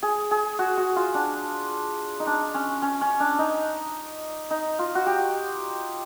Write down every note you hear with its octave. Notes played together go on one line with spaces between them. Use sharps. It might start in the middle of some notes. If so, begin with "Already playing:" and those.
G#4
G#4
F#4
F#4
F4
D4
D#4
D4
C#4
C#4
C#4
D4
D#4
D#4
F4
F#4
G4